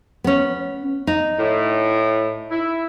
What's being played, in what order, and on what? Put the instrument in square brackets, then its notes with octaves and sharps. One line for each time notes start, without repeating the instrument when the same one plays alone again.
[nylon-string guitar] B3 C#4
D#4
[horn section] A2
E4